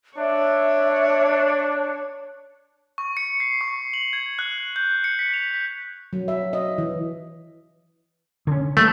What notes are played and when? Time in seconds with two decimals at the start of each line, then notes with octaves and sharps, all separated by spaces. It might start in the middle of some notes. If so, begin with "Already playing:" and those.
0.18 D4 C#5 E5
2.98 C#6
3.17 C#7
3.40 C7
3.61 C#6
3.94 F#7
4.13 G#6
4.39 F#6
4.76 G6
5.04 C#7
5.19 B6
5.34 F7
5.54 B6
6.13 F#3
6.28 E5
6.53 D#5
6.78 E3
8.47 D3 C#4
8.77 E3 G3 A3 A#3